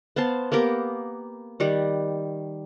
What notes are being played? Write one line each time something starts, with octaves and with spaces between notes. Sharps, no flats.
B3 C5 F5 A5
A#3 B3 G4 A#4
D#3 G3 F#5